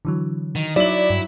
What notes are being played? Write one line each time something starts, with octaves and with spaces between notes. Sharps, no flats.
D3 E3 F#3
D#3
F#3 D#4 E4 D5 E5 F#7
G2